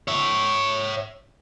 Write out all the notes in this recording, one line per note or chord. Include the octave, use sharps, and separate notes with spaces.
C#5 E5